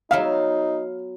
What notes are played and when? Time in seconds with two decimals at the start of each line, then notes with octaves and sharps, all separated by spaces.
0.11 F#3 B3 D#4 E5 F5